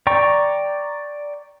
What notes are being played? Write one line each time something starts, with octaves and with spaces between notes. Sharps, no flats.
D5 G5 A#5 C#6